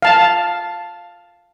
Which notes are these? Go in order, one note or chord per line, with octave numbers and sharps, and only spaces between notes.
F5 A5